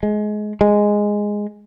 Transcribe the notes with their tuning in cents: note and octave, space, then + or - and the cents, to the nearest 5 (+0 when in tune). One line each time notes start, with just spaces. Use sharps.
G#3 +25
G#3 -5